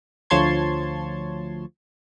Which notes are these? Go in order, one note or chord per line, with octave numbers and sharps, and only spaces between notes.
D2 F3 C#5 A5 C6 G#6